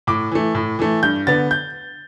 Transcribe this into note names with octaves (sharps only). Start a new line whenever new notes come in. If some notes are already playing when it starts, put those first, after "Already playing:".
A2 D6
E3 A3
A2
E3 A3
G2 G6
D3 B3 A6
G6